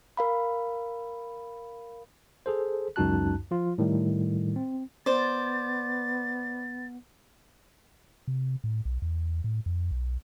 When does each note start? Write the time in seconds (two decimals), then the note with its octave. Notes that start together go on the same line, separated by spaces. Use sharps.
0.17 A#4 F5 B5
2.46 G#4 A4 C5
2.96 C#2 F#2 D#4 F#4 A5 F#6
3.51 F3 F4
3.78 A2 D#3 G3
4.56 C4
5.06 B3 C5 D5 A6
8.28 C3
8.64 A2
8.85 B1
9.02 E2
9.44 A2
9.66 F2
9.91 B1